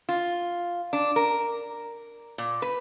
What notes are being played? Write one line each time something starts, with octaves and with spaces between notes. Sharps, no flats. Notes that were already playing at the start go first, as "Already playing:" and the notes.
F4
D4
A#4
A#2
B4